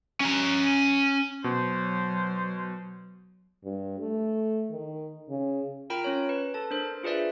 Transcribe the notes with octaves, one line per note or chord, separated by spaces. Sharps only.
C#4 A#5
B2 F#3 C5
G2
A3
D#3
C#3
F4 A#4 G5 A#5 B5 D7
C#4 C#5
B4
A4 A5
D4 A#4 C5
F4 G#4 B4 C5 D5 E5